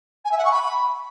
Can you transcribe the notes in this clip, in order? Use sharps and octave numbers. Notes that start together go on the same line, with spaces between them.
G#5
E5
F#5
C#6
B5